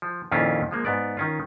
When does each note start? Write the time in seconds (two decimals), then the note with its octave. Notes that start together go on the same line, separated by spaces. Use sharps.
0.02 F3
0.32 F2 A#2 D#3 C#4 E4 F4
0.71 F3 G#3 A#3
0.85 G#2 B3 D5
1.17 D#3 C#4 F4